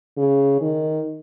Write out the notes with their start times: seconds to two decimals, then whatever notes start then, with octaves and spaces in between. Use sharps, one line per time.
0.17 C#3
0.61 D#3